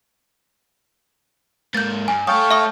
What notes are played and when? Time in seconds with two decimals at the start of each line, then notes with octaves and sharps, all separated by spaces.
1.74 G#2 A#3 G6 A6
2.08 G2 G#5
2.27 A3 A4 C#5 F5 G5 D#6
2.51 E5 C#6 D#6